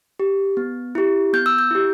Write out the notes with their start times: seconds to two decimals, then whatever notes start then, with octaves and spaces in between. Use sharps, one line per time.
0.20 G4
0.57 B3
0.95 E4 G4
1.33 B3 G6
1.46 E6
1.59 G6
1.71 E4 G4